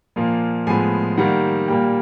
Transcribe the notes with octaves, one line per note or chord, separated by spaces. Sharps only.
A#2 F3 A#3
A2 F3 G#3 B3 G#5
D#3 G3 A#3 F#5
A#2 G3 A#3 G5